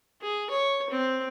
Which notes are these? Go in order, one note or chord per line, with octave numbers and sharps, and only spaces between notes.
G#4
C#5
C4